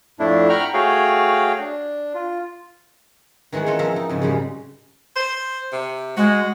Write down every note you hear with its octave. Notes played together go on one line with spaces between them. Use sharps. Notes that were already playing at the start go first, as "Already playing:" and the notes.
F2 A2 A3 D4 E4
F#5 G5 A#5 B5 C#6 F6
A3 F#4 G#4 C#5 F5 G5
D4
F4
D#3 E3 G#3 C#5 F#5
C#4 F4 A4 A#4 C5 C#5
E2 F3 C4 A#4 E5
D#4
F2 G#2 C#3
F#2 A2 C#3 G3 G#3
C5
C3
G#3 F#4